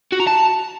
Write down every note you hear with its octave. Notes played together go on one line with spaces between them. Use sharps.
F#4
A#5
A5